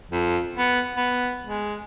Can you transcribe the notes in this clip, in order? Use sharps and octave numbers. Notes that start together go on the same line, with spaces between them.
F2
B3
B3
G#3